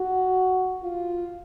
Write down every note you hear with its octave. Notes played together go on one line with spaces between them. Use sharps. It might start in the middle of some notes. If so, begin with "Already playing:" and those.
Already playing: F#4
F4